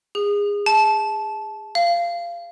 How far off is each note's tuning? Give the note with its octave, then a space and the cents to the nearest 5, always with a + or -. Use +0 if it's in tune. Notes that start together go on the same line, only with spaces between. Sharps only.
G#4 -25
A5 -20
F5 -20